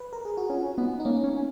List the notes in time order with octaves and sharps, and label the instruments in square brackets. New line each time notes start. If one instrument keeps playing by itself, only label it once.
[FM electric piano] B4
A#4
G#4
F#4
[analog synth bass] C#4 [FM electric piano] F4
[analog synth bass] B3 [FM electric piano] D#4
[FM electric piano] D#4
[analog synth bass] A#3 [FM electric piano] C#4
[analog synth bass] C#4